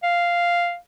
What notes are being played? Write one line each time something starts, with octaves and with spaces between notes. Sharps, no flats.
F5